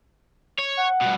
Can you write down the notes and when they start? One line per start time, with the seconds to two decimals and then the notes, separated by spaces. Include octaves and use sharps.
0.58 C#5
0.77 F#5
1.02 G2 B2